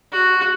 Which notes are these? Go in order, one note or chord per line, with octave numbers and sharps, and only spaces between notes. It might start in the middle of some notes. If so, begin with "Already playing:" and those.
F#4